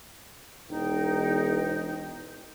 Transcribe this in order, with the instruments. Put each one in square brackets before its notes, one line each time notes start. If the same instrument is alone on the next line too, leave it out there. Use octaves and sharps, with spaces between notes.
[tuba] E1 [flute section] D#4 G5